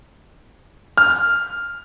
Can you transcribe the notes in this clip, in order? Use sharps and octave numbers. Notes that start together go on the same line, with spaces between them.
F6